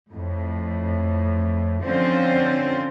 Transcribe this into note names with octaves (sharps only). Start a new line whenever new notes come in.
F2 A2
D3 F3 C4 C#4 F4 C5